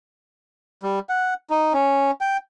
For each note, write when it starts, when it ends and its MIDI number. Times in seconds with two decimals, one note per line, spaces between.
0.83 0.99 55
1.09 1.34 78
1.50 1.73 63
1.73 2.11 61
2.21 2.37 79